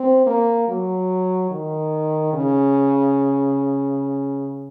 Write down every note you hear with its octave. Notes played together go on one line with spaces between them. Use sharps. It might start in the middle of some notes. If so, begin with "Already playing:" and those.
Already playing: C4
A#3
F#3
D#3
C#3